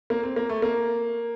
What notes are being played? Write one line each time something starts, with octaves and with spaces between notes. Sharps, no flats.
A#3
C4
A#3
A3
A#3